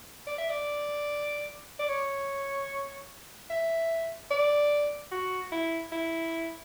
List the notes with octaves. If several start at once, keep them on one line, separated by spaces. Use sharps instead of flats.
D5
E5
D5
D5
C#5
E5
D5
F#4
E4
E4